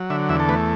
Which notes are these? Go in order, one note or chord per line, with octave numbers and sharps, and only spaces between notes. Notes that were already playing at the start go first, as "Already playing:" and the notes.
Already playing: F#3
D3 E5
E2 E5
A4
A3 B4